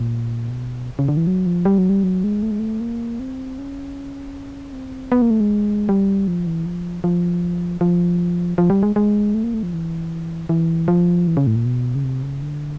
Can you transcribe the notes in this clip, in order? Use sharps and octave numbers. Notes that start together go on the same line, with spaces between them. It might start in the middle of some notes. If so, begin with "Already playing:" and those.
Already playing: A#2
B2
C#3
D3
E3
F#3
F3
G3
F#3
G3
F#3
G#3
A3
G#3
A3
A#3
C4
C#4
C4
B3
A#3
A3
G#3
G3
F3
E3
F3
F3
F3
F3
G3
G#3
G#3
A3
A#3
A3
F3
E3
E3
F3
E3
C#3
A2
A#2
B2
C#3
C3
C#3
D3